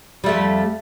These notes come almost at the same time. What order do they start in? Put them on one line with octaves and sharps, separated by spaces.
G3 A3 F2